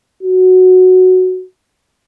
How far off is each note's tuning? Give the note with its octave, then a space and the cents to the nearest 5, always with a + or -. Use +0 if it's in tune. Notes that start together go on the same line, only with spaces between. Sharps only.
F#4 +0